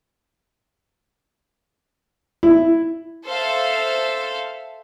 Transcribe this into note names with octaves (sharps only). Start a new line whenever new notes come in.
E4
A4 C5 E5 F5